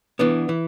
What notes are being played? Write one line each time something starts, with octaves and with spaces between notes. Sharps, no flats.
E3 B3 D4
E3